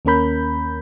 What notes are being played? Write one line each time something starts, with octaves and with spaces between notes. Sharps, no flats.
D#2 A#3 C#4 A#4 B5 G6